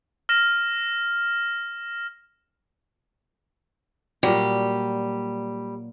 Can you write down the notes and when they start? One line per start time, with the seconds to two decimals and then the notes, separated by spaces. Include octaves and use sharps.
0.29 F6 A#6 E7
4.23 A#2 F#3 G3